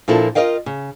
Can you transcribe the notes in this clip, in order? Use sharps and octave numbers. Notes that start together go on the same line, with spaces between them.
A#2 F3 A#3 D4 E4 A4
F4 A4 A#4 D#5 F5 G5
C#3